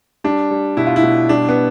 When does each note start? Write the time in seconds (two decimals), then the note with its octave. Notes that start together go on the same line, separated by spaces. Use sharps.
0.24 G3 D4
0.51 G3
0.77 B2 E4
0.86 F4
0.96 E4
1.03 B2
1.29 G3 D4
1.49 B3